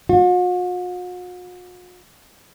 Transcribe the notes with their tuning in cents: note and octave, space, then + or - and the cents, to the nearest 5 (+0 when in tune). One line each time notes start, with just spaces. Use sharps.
F#4 -45